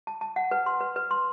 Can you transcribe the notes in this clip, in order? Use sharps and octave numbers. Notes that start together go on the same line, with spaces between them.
A5
A5
F#5
B4
C6
B4
B4
C6